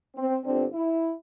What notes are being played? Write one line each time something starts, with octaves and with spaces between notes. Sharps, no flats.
C4
G1 G2 D3 C4
E4